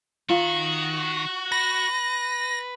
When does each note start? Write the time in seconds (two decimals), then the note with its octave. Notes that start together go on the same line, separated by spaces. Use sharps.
0.30 D#3 F4 F#4
1.52 B4 A#6